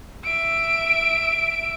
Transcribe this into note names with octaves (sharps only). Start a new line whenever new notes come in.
E5 D7